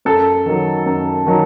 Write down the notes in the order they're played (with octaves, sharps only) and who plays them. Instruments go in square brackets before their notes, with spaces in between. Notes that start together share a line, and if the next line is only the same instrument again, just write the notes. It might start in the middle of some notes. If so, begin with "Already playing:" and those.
[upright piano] F#2 A4
D#3 F#3
F#2
D#3 F#3